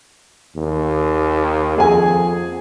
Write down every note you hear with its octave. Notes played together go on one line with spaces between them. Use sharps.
D#2
F2 G#4 G#5